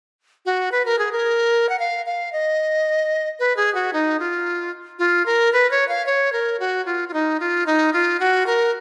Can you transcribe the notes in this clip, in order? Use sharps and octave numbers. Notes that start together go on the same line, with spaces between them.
F#4
B4
A#4
G#4
A#4
F#5
F5
F5
D#5
B4
G#4
F#4
D#4
F4
F4
A#4
B4
C#5
F5
C#5
A#4
F#4
F4
F4
D#4
F4
D#4
F4
F#4
A#4